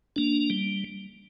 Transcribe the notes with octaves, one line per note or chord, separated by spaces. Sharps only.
A#3 D4
G3